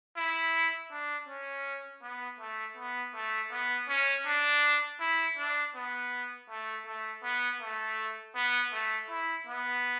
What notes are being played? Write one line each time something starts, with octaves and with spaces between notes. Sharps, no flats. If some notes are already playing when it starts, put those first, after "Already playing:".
E4
D4
C#4
B3
A3
B3
A3
B3
C#4
D4
E4
D4
B3
A3
A3
B3
A3
B3
A3
E4
B3